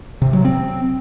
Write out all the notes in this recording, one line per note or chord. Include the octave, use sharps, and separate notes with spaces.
C3
F#3
C4